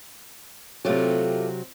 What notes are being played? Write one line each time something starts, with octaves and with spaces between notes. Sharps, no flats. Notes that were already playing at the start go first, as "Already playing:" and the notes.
C3 F#3 A3 F4 G4